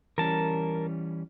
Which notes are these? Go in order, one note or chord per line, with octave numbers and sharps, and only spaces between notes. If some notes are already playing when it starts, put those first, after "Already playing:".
E3 G3 C#4 A#4 A5